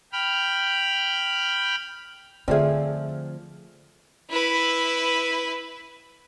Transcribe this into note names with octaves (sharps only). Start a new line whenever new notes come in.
G5 B5 F6
D3 F3 A3 C4 G#4 D5 E5 F6
E4 B4